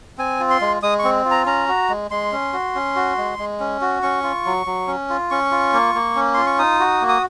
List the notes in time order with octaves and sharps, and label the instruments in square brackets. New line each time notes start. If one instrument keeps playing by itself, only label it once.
[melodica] C4 G#5
F4
C6
G#3
G#3 D#6
C#6
C4
F4
A#5
C#4 A#5
F#4
G#3
G#3 C6
C#4
F#4
C#4
F#4
G#3
G#3
C#4
F#4
C#4 C#6
F4
F#3
F#3
C#4
F4
C#4 C#6
F4
A#3
A#3
C#4
F4 C6
C#6
D#4 D#6
F#4
A#3
D#6